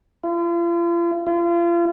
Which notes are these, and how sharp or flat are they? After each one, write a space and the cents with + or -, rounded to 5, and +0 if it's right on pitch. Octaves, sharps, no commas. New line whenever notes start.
F4 -40
F4 -35